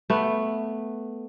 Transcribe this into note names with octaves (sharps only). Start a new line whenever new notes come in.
A3 B3